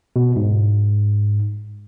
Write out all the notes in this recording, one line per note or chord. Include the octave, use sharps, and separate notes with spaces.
B2
G#2